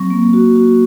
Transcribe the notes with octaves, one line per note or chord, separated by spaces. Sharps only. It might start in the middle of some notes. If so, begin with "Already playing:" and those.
Already playing: F#3 C4 C#6
A#3
F#4
F#4